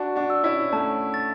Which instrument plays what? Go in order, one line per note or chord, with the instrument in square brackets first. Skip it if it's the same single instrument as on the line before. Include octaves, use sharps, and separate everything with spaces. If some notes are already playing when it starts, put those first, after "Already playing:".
Already playing: [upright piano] D4 F#4 [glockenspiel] A5
[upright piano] D4 F#4
[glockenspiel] E6
[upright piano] C#4 E4
[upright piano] A3 C#4 [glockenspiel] A5
[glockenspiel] A6